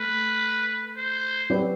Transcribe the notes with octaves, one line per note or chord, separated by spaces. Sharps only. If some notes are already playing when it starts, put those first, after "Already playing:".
Already playing: A3 B4
C5
F#3 C4 G4 B4 D5